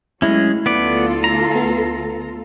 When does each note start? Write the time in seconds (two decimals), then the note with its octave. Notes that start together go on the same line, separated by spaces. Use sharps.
0.22 F#3 G#3 A3 C#4 E4
0.66 D2 B3 F4 A4 D5
1.24 A#5
1.55 B3